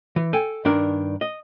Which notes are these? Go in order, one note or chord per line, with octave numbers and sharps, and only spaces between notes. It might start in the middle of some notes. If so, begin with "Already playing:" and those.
E3
A4 G5 G#5
G2 D#3 D4 A#4
D#5